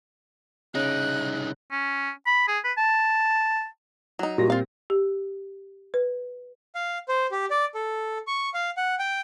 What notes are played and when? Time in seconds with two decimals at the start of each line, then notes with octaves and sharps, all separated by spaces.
0.75 C2 C#3 D#4 D6 F#6
1.72 C#4
2.26 B5
2.48 G#4
2.64 B4
2.78 A5
4.19 F#3 D#4
4.38 A#2 G3 F#4 A#6
4.50 C4 F4 F5
4.90 G4
5.94 B4
6.75 F5
7.08 C5
7.31 G4
7.50 D5
7.75 A4
8.27 C#6
8.54 F5
8.77 F#5
8.99 G5